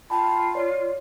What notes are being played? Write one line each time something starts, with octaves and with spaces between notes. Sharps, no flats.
F4 G5 A5 B5
C#5 D5